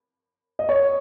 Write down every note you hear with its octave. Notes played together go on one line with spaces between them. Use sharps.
D#5
C#5